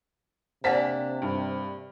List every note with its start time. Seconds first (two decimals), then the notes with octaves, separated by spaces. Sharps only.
0.64 C3 A#3 D4 C5 F#5 G#5 A5 B6
1.22 G2